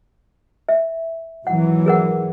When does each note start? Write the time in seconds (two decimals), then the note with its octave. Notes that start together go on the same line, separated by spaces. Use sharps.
0.69 E5
1.47 G#1 E3 F#3 F#5
1.86 G#4 A#4 F#5